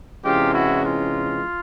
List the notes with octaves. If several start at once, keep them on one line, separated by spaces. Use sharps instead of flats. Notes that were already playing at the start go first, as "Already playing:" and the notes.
C3 E3 G#3 C#4 F4 G4
E4 F#4
F4